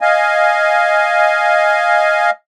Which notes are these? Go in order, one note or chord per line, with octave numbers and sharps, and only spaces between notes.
D#5 F5 G#5